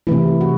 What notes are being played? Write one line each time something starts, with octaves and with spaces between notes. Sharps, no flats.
C3 E3 A3 E4
F#4